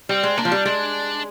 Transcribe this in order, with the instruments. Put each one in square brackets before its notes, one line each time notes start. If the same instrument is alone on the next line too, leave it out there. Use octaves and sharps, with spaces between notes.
[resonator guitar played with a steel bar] G3 [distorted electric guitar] C4
[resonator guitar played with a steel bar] G#3
[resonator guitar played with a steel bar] A#3 [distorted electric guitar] D4
[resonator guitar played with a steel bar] F3
G3
[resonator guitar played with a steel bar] G#3 [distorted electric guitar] D4